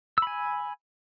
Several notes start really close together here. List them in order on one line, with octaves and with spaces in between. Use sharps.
E6 B5 G#5